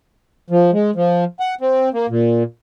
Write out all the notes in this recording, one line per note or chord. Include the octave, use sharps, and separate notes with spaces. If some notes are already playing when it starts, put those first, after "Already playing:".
F3
G#3
F3
F#5
C4
A#3
A#2